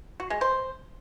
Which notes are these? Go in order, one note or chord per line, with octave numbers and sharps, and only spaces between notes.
F#4
G#3
C5